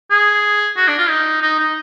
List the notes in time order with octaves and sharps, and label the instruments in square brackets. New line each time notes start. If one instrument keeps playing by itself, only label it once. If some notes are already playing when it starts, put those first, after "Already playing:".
[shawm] G#4
F#4
D4
F4
D#4
D#4
D#4